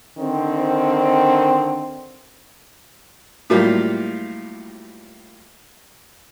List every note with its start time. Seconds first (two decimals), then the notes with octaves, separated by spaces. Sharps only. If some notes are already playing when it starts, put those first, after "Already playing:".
0.18 D3 D#3 C4
3.50 A2 F#3 G3 A#3 F4 G4